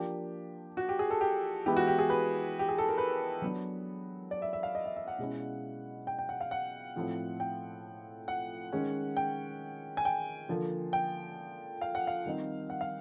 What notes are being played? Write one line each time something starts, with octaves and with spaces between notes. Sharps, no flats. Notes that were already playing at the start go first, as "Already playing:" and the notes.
Already playing: F3 A#3 D4 G4
F#4
G4
G#4
A4
G4
E3 G#3 B3 E4 G4
F#4
G4
G#4
B4
G4
G#4
A4
A#4
B4
F#3 B3 D4
D5
E5
E5
F5
D#5
E5
E5
F#5
B2 G#3 C#4 E4
G5
G5
F#5
F5
F#5
A2 F3 A3 C4 E4
G5
F#5
D#3 G#3 C#4
G5
G#5
G5
D3 F3 A#3
G5
F5
F#5
F5
D#3 G3 C4 D#4
F#5
F5